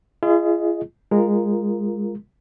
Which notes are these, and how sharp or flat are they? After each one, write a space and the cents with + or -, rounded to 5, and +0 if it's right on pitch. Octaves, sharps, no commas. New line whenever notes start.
F4 -40 G#4 +0 D#5 +0
G#3 -15 F4 +0 A#4 +0